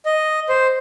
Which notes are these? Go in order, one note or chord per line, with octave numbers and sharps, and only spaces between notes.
D#5
C5